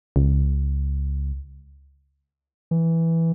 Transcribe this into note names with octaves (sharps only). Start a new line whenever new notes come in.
C#2
E3